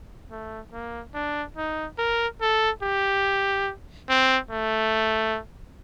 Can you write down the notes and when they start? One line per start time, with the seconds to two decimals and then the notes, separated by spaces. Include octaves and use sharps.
0.31 A3
0.73 A#3
1.14 D4
1.57 D#4
1.98 A#4
2.41 A4
2.83 G4
4.09 C4
4.51 A3